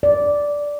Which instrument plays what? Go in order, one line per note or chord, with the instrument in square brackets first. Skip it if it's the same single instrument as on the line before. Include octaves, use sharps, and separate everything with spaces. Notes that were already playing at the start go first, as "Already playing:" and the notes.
[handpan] D5